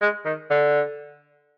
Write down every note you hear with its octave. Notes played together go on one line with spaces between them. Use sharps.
G#3
D#3
D3